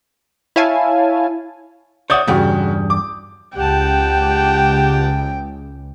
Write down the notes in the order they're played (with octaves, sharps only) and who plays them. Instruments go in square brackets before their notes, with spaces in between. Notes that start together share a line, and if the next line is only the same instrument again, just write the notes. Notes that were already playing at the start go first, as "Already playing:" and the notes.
[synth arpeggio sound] E4 C#5 F5 G#5 A5
[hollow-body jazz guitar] C#5 D5 E5 [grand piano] F#5 D#6 G6
[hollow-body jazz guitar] E2 G2 [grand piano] C#3 F#4
[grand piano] D6
[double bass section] C#2 [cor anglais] G4 [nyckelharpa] F#5 A5 [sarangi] G5